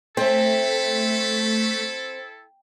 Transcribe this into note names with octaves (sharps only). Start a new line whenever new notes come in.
A3 C4 E4 A4 B6